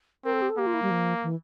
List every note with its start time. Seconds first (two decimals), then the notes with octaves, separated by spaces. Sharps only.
0.24 C4 A#4
0.33 A4
0.42 G4
0.49 A4
0.57 A#3 G4
0.66 F4
0.74 E4
0.82 G3
0.91 F3
1.23 E3